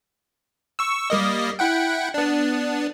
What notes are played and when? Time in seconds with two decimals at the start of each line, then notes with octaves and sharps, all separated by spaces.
0.79 C#6 E6
1.10 G3 A#3 D#5
1.59 E4 F#5 G5
2.14 B3 D4